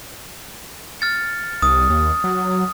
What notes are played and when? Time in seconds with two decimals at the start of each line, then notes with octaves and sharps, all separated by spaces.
1.01 F6 A6 C#7
1.62 C2 D#6
1.90 D#2
2.24 F#3